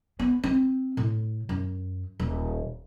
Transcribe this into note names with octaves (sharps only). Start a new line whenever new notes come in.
B3
C4
A2
F#2
D#1